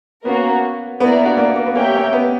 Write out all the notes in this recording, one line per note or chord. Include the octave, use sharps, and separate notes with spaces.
A#3 B3 C#4 F#4 A#4
A#3 B3 E4 A#4 D5
D4 F#4
A#3
B3
A#3
B3
A#3 C#4 G4 A#4 C#5 E5 G5
A#3 C#4
B3